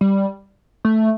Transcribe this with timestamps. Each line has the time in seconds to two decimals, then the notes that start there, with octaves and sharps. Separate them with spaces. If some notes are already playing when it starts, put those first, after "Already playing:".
0.01 G3
0.85 A3